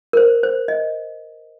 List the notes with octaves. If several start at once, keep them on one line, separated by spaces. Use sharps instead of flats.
A#4
C5
C5
D#5